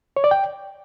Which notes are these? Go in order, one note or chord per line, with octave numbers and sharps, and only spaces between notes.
C#5
D5
G5